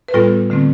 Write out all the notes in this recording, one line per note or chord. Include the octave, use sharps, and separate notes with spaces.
B4
A2 G3 B3 F4 A4
D3 A3 C4